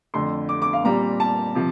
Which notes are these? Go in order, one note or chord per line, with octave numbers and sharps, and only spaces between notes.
F2 D3 A3 C6
D6
D6
F5
A#2 G3 C4 A#5
A5
C3 F3